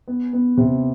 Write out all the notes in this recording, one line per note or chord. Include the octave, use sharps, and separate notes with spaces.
B3
B3
C3